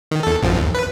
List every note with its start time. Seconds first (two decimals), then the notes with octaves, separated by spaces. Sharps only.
0.11 D#3
0.23 E2 A4
0.42 A#1 F#2 F3
0.58 D#2
0.75 B4